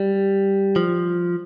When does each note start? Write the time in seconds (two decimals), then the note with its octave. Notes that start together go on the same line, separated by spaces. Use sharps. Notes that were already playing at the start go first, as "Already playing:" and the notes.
Already playing: G3
0.76 F3